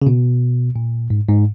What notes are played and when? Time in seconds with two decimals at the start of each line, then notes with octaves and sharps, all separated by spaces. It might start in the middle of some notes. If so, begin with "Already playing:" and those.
0.02 C#3
0.07 B2
0.76 A#2
1.10 G#2
1.29 G#2